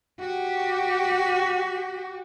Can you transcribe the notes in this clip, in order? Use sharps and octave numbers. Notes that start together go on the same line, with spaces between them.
F#4 G4